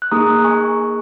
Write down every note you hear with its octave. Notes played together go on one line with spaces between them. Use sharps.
F#6
A#3 D#4 G#4 A#5 D#6
G#5 C#6